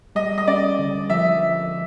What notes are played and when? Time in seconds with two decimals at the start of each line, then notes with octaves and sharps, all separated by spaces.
0.15 G3 D#5
0.38 D#5
0.47 C#4 D5
0.79 D3
1.10 F3 E5